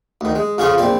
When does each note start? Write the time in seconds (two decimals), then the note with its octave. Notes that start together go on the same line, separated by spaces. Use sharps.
0.21 D2 D#3
0.35 G#3
0.58 F2 C#3 C#4 F4 G#4 C#6
0.78 A#1 C4 D5